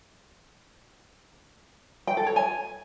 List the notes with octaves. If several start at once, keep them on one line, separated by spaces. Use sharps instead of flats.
G5
A4
C#5
G#5